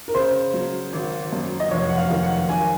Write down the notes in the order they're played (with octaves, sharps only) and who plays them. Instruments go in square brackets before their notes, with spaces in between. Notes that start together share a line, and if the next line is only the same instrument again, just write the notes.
[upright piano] A#4
C#3 C5
F#3
G#1
F#2
D#5
F1 C#5
F#5
F5
D#3
F#5
G#1 G#5